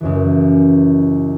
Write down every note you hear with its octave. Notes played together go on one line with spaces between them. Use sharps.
C#2 F#2 E3